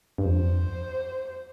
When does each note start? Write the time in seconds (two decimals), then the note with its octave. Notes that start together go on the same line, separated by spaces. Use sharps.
0.18 G2
0.26 F2 C5